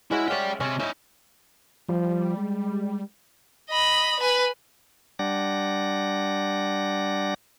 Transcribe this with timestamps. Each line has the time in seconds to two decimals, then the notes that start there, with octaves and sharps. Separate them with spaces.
0.11 G#3 C#4 E4 F#4
0.28 C#5 D5 E5 F5 G5
0.60 C3 C4 C#4 D#5
0.80 C#4 D#4 E4 E5
1.89 F3 G3
2.37 G#3
3.70 D#5 B5
4.20 B4 G#5
5.19 G3 D4 D5 F#5 A#6